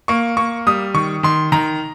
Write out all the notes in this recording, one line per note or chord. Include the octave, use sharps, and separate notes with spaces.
A#3 C#6
A#3 C#6
G3 D#6
D#3 C#6
D#3 C6
D#3 A#5